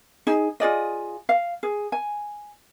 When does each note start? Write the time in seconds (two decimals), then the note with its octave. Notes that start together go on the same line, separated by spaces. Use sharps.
0.27 D#4 G#4
0.60 F4 G#4 D5 D#5
1.29 F5
1.63 G#4
1.92 G#5